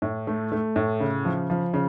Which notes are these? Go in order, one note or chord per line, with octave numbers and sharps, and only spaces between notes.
A2
A3
A3
A2
C#3
F3
F3
C#3